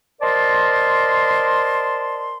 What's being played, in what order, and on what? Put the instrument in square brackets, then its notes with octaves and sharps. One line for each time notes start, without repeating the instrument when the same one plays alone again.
[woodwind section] A#4 C5 D5 D#5 A5 C6